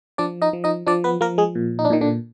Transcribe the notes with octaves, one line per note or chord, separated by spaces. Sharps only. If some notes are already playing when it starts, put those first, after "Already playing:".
F3 D4 D5
D#4 D#5
F3
D#4 D#5
F3 D4 D5
B3 B4
F3 A#3 A#4
G#3 G#4
A#2
D#4
D4
A#2 D#3 D#4
D3 D4